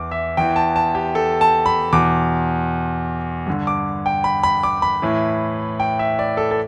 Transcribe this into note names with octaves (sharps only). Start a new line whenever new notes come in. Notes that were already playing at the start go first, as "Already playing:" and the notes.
Already playing: E2 E3 D6
E5
E2 E3 G5
A5
A5
G4
A4
A5
B5
E2 B2 D6
G2 D3
D6
G5
B5
B5
D6
B5
A2 E3
G5
E5
D5
A4
A4